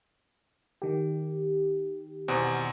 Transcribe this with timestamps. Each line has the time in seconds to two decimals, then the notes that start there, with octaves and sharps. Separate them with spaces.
0.82 D#3 G4
2.28 E2 B2 C4